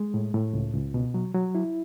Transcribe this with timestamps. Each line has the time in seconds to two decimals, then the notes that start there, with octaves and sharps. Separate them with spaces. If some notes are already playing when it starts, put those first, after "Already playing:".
Already playing: G#3
0.14 A2
0.34 A2
0.53 C#2
0.74 C#2
0.94 B2
1.14 F#3
1.34 F#3
1.55 E4